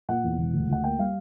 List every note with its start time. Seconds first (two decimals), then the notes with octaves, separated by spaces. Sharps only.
0.08 A#2 F#5
0.24 E2
0.38 E1
0.53 D2
0.69 D2 F#5
0.84 A#3 G5
0.99 G3 F5